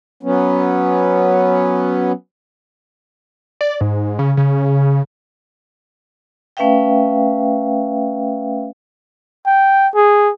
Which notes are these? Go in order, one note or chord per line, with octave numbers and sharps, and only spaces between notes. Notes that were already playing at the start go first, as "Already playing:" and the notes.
F#3 B3 C#4
D5
G#2
C#3
C#3
A3 C#4 B4 E5 F5 G5
G5
G#4